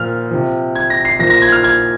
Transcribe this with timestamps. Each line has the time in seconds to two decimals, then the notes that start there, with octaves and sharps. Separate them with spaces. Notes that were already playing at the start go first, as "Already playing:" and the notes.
Already playing: A#2 F3 F6
0.31 C3 F3
0.76 G#6
0.90 A#6
1.05 C7
1.19 A#2 F3 A#6
1.30 A#6
1.42 G#6
1.52 F6
1.64 G#6